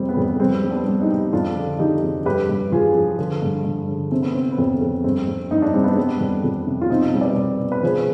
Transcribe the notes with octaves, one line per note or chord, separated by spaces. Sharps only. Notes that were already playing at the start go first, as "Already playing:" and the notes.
Already playing: F2 C3 G3 C4
B3
F2
G3 C4
G3
B3 D4
G3
D#4 G4
G3
F2 D4 F4
D3
F3 D#4 G4
F2
G2 G4 B4
G2
F3 F4 G#4
F3
D3
G2
G2
D3
C3 C4
B3
C3 C4
B3
F2 C4
F2
G2 C4
G2
G2 D#4
D4
G3 C4
B3 D4
G3
F2
F2
C3
F4
B2 C4 D#4
G3
B4 D5
B2
B2
B4
F3 G#4 C5